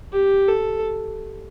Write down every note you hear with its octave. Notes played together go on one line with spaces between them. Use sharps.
G4
A4